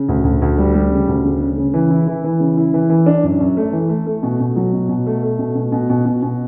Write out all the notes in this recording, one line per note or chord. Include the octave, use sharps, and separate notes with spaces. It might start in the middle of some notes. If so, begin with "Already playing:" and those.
Already playing: C#3
D2
D2
D2
G3
G3
C#3
D2
C#3
C#3
C#3
E3
E4
E3
E3
C#3
E4
E3
E3
D4
F#2
F#2
A3
E3
A3
A3
B2
B2
F#3
B2
B2
A3
A3
B2
B2
B2
B2
B2
B2